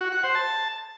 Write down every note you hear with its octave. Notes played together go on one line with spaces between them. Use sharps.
F#4
F#5
C5
A5